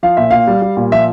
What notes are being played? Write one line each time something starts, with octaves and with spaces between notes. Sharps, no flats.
F3 F5
A#2 E5
A#2 F5
G3
G3
A#2
F3 E5